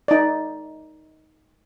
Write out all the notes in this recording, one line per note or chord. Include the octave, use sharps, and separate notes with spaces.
D#4 D5